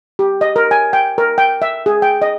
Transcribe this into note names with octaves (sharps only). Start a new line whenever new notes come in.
G4
D#5
A#4
G#5
G5
A#4
G5
E5
G#4
G5
D#5